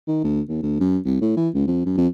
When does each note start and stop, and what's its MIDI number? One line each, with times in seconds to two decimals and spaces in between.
0.07 0.20 51
0.24 0.41 38
0.49 0.62 39
0.62 0.78 38
0.80 0.98 42
1.05 1.20 36
1.21 1.35 45
1.36 1.49 52
1.54 1.64 37
1.67 1.82 41
1.86 1.95 42
1.97 2.07 41